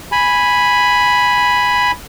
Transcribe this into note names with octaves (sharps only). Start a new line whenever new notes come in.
G#5 B5